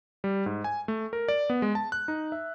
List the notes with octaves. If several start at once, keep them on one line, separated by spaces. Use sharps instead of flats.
G3
G#2
G#5
A3
A#4
D5
B3
G#3
A5
F#6
D#4
E5